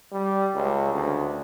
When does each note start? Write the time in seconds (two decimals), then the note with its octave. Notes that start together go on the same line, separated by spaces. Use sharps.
0.12 G3
0.55 C#2
0.94 D2